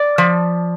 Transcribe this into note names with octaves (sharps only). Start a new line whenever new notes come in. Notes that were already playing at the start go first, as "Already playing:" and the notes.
Already playing: D5
F3